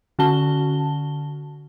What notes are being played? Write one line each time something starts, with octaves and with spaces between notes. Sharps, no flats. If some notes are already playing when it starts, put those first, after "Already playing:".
D3 C#4 F#4 A5 G7